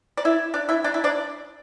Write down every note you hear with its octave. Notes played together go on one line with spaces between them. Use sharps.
D5
E4 E5
D4 D5
E4 E5
D4 D5
E4 E5
D4 D5